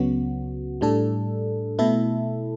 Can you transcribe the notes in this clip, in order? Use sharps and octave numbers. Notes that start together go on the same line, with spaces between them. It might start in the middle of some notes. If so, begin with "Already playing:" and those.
Already playing: C#2 C#3 F#3 B3 F#4
A2 G3 D4 A4
B2 A3 E4 A4